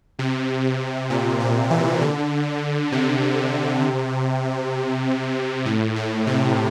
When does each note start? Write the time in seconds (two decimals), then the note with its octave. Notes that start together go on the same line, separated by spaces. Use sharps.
0.19 C3
1.10 A#2
1.40 C3
1.70 E3
2.01 D3
2.92 C3
5.66 A2
5.96 A2
6.27 C3